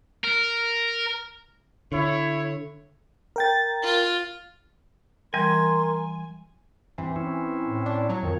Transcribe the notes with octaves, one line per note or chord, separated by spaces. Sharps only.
A#4
D3 E4 C#5
A#4 G5 A6
F4
E3 G3 A#4 G#5 C6
G2 E3 C4
C4 C#4 E4
A2
D4
F#3 C#5
F2 D#3